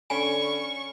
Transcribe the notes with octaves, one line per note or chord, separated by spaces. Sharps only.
D3 C#4 G#5 B5 C#6